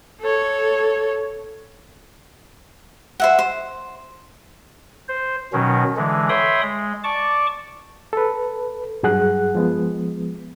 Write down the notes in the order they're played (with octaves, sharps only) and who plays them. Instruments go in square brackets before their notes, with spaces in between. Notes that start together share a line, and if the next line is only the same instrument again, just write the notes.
[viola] A4 C#5
[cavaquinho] C5 E5 F#5
C5
[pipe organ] C5
B2 D#3 F#3 C#4
D3 E3 G#3
C#5 E5 G5 B5 C6 D#6
G#3
D5 A5 C#6 D6
[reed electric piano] A4 B4
G2 F#3 G#4 F#5 F#6
F3 G#3 B3